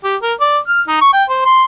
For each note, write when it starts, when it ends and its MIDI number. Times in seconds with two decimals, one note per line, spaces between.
0.04 0.16 67
0.22 0.33 70
0.40 0.57 74
0.67 0.82 89
0.88 0.99 63
1.01 1.10 85
1.13 1.24 79
1.29 1.43 72
1.46 1.65 84